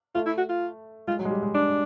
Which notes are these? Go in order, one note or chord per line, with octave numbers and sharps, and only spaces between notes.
A3 F4
E4
F#4
F4
G#3 F4
F#3
G#3
G3
G#3
D4